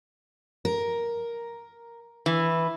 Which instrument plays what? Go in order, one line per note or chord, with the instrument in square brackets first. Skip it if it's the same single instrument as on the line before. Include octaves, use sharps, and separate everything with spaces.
[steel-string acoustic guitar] A#4
[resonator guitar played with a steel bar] E3